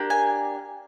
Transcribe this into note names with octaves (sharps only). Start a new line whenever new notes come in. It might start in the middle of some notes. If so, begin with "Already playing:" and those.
Already playing: A#3 D4 G4
G#5